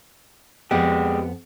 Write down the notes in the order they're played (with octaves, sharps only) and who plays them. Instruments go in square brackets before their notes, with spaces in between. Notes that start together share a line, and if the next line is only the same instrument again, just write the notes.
[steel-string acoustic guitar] F2 B3 F#5 [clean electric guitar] G#3 G4